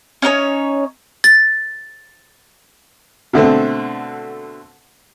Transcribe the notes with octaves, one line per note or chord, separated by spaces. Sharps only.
C#4 D#4 A#4 C#5
A6
B2 D3 A3 C4